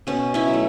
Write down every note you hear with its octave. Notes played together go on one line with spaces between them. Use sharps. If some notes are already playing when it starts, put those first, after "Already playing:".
B2 C#4
C#4 E4
F#3
A3